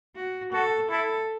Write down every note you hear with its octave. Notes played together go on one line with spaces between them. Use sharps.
F#4
F#4 A4
E4 A4